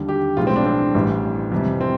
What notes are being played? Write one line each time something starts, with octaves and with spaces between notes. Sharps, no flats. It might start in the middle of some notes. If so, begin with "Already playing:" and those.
Already playing: D#2 D3 G3
G4
B1 A2 F3 G#3 F4
C4
D4
C4
A1 A2 E3 G3
F2 C3 E3 G3
C4